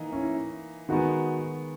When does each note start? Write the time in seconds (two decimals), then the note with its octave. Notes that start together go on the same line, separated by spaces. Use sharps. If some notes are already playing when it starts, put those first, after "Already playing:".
Already playing: E3 A#3 D#4
0.12 C#4 E4
0.89 D#3 G#3 B3 D#4 F#4